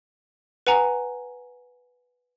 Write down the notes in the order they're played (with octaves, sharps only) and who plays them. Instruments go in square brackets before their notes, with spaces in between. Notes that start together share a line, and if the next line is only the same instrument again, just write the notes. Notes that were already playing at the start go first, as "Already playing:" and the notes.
[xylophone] B4 F#5 G#5 A#5